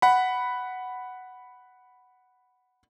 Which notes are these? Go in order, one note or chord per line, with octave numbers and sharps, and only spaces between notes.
F#5 B5